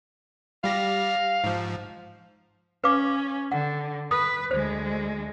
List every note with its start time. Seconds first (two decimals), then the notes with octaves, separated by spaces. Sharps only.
0.64 G3 G4 F5 A#6
1.44 G#2 F3
2.84 C#4 B4 F5 D6
3.52 D3 F#5
4.11 B4 D#6
4.51 D2 G#3 C5